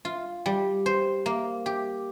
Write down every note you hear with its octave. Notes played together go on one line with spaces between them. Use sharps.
F4
G3
C5
A#3
G4